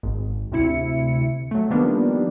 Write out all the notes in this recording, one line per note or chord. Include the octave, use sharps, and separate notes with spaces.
G#1
D2 C3 E4 C#7
F#3 A3
D#3 F3 G3 A#3 B3 D4